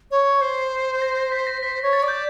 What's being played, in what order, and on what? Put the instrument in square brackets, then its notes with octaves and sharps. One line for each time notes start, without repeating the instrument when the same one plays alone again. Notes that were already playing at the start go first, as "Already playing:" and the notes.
[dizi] C#5
C5
[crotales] A#6
A#6
B6
A#6
[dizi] C5 [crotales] B6
[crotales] A#6
[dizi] C#5
[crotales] A6
[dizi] D5
[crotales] G6